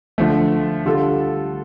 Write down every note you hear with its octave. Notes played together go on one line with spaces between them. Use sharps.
D3 F3 A3
D3 G3 F4 A4